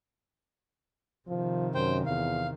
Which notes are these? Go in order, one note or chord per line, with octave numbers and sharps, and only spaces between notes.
C3 D#3 F3
F#2 C5 G5
E2 F5